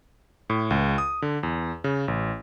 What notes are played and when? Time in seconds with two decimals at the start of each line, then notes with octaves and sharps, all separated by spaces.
0.50 A2
0.70 C#2
0.98 D#6
1.22 D3
1.43 E2
1.84 C#3
2.08 A1